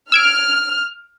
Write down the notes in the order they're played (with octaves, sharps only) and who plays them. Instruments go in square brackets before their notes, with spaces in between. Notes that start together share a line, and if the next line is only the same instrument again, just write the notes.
[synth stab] E6 G#6 D7 [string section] F6